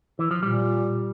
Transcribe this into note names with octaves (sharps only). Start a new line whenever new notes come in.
E3
F3
A#2 G3